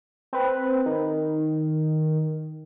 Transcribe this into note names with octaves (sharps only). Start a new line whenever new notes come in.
C4 B4
D#3